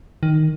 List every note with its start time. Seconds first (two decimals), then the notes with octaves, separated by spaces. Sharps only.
0.23 D#3